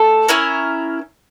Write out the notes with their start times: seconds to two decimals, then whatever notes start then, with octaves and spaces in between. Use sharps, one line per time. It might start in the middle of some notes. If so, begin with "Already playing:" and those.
Already playing: A3 A4
0.28 C#4 E4 A#4